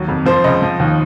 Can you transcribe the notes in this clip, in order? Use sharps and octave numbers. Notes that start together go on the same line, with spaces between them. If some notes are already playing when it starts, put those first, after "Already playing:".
Already playing: D#2 F#3
F2
F3 C5
C#2 D#5
F3
D#2